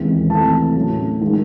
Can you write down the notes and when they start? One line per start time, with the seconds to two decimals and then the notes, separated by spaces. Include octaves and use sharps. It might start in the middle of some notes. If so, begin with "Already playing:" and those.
Already playing: D#2 C#3 E3 G#3 C4
0.29 C3 E3 A3 C4 A5
0.75 A2 F#3 C#4
1.21 D#3 G#3